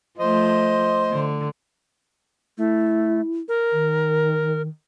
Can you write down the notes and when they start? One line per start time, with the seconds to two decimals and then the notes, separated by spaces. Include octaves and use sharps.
0.19 F3 A3 C5 D#5
1.11 D3
2.58 A3 E4
3.48 A#4
3.72 D#3